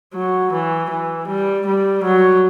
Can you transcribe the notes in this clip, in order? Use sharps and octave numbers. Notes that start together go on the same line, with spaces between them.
F#3
E3
E3
G3
G3
F#3